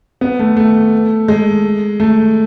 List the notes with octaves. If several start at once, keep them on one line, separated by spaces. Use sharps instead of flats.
B3
A3
A3
G#3
A3